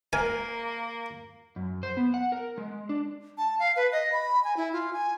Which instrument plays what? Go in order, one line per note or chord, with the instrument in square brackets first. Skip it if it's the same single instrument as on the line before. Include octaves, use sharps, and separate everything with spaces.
[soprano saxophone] A#3 [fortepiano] A#4 [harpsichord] G#5
[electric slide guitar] F#2
C5
B3
F#5
A#4
G#3
D4
[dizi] A5
F5
B4
D#5
B5
G#5
E4
F4
G#5